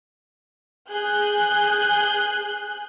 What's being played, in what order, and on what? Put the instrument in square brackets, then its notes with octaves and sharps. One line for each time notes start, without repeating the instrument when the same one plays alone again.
[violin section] G#4 F#6 G6